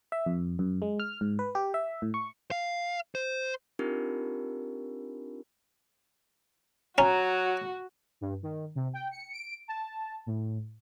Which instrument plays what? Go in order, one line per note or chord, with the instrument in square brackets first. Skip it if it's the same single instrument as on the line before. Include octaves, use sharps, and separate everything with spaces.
[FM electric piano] E5
F2
F#2
G#3
F6
G#2
B4
G4
E5
A2
C#6
[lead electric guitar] F5
C5
[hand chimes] C4 D4 D#4 F4 G4 A#4
[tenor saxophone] F#3 [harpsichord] C#4 [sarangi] F#4 [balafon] A#5
[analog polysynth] G2
D#3
C3
G5
C#7
D7
A5
A2